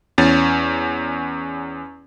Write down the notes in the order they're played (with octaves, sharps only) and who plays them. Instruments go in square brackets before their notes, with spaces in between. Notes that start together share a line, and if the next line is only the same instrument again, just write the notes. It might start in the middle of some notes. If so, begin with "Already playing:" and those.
[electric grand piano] E2 C#4 A6